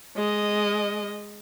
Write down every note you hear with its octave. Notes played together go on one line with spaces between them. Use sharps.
G#3 D#5